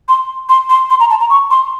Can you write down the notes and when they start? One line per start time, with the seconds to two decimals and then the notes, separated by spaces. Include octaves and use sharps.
0.08 C6
0.49 C6
0.70 C6
0.90 C6
1.00 A#5
1.10 A5
1.20 A#5
1.30 C#6
1.51 C6